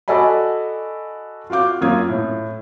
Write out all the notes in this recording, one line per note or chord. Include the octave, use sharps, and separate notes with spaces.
F#4 A4 D5 D#5 G#5 B5
F4 F#4 F5 D6 G6
F#2 A#3 F4 D#6 G#6
A2